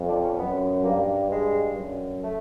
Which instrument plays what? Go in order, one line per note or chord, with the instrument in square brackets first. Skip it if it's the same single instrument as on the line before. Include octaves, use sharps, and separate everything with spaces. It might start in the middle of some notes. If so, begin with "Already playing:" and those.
Already playing: [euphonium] F2
[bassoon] D4
C#4
[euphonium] F#2 [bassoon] B3
[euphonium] G2 [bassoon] A#3
[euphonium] G2 [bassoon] G#3
[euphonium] F#2
[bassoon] A3